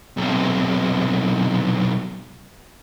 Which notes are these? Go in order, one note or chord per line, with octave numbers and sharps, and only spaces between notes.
B1 C3